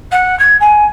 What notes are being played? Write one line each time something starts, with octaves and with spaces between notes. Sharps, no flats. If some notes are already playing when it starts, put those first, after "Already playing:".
F#5
G#6
G#5